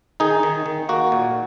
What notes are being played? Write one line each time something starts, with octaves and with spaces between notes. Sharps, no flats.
D#3 D#4 G#4
D#3
D#3
A#3 F#4
A#2